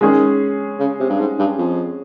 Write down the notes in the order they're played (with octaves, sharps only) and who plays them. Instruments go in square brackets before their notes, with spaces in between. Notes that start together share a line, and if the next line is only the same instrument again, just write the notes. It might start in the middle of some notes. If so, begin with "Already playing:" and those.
[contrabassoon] D#3 [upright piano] G#3 C#4 G#4
[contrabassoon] C#3
C3
G2
G#2
G2
F2